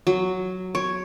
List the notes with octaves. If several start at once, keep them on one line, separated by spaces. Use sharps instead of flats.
F#3
C#5